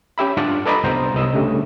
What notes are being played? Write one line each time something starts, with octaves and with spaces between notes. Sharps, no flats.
C#4 G4 E5 B5
G2 D4 F4 D5 F#5
A4 B4 D5 D#5 A#5 B5
C2 G2 B3 C5 A#5
C2 B3 D#5 E6
C#3 G3 A3 D4